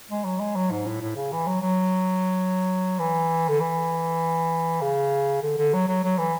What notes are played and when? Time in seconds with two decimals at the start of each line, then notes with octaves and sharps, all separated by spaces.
0.10 G#3
0.24 F#3
0.40 G#3
0.55 F#3
0.71 G#2
0.86 A2
1.01 A2
1.16 C#3
1.32 E3
1.47 F#3
1.62 F#3
2.99 E3
3.48 D3
3.60 E3
4.81 C#3
5.42 D3
5.58 D3
5.73 F#3
5.88 F#3
6.04 F#3
6.18 E3